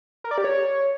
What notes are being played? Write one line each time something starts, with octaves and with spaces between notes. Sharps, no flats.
A#4
D5
G4
C#5